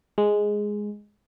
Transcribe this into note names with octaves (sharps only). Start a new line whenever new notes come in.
G#3